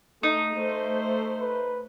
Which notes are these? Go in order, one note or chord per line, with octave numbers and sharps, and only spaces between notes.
A3 D#4
A3 C5
B4